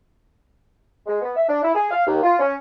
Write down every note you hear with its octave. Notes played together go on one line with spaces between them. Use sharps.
G#3
B3
E5
D4
E4
G#4
F5
D#2
F4
C#4